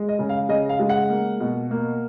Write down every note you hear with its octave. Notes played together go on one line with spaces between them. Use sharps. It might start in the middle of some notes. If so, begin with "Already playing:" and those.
Already playing: G#3
D#5
C#3
F5
C#3 D#5
F5
G#3
F#5
A#3
B2
A#3